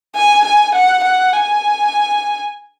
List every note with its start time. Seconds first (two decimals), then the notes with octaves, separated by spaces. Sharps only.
0.15 G#5
0.45 G#5
0.75 F#5
1.03 F#5
1.33 G#5